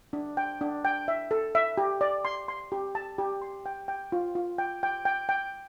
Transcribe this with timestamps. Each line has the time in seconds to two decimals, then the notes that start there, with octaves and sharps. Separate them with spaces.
0.13 D4
0.37 G5
0.61 D4
0.85 G5
1.08 E5
1.31 A4
1.55 E5
1.78 G4
2.01 D5
2.25 C6
2.48 C6
2.72 G4
2.95 A5
3.18 G4
3.42 C6
3.66 G5
3.88 G5
4.12 F4
4.35 F4
4.58 G5
4.83 G5
5.05 G5
5.29 G5